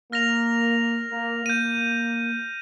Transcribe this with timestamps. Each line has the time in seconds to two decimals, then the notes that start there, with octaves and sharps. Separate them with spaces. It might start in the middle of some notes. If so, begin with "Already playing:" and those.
0.12 A#3 F6 A#6 F7
1.12 A#3
1.45 A#3 G6 A#6 D#7